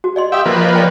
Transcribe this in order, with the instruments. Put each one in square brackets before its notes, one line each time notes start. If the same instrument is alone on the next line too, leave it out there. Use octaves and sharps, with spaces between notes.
[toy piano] F#4
D5 D#5 C6
[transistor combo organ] G4 E5 [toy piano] F5 D#6
[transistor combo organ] F3 A#3 B4
[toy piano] C#5 D#5
C#5 D5 G5